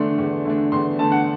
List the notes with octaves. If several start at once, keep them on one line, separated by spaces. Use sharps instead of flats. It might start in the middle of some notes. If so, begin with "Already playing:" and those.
Already playing: E2 D3 A3 D4 C6
E2
D3 A3 D4
E2 C6
D3 A3 D4 A5
F#5